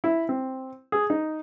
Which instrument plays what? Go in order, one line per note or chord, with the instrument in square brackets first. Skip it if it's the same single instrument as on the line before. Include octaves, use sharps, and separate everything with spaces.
[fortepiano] E4
C4
G#4
D#4